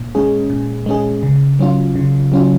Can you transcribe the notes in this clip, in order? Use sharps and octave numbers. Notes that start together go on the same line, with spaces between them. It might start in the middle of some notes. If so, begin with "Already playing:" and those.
Already playing: A#2
G#3 C#4 G#4
A#2
G#3 C#4 G#4
C#3
F#3 C#4 F4
C#3
F#3 C#4 F4